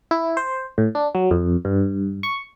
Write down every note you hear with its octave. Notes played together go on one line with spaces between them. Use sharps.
E4
C5
A2
D4
F#3
F2
G2
C#6